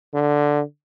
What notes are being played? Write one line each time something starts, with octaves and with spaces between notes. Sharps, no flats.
D3